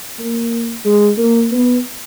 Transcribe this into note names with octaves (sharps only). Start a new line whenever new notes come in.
A#3
G#3
A#3
B3